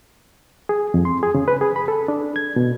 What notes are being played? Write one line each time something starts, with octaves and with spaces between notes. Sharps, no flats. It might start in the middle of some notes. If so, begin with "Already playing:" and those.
G#4
F2
C6
G#4
C#3
B4
G#4
B5
A4
D4
G#6
B2